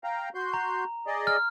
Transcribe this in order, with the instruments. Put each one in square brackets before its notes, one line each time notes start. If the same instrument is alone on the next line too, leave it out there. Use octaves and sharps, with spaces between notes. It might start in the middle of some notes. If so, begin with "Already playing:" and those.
[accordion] F5 G5 A#5
F#4 C6 G6
[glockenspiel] A#5
[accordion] G#4 D5 D#5
[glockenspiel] F6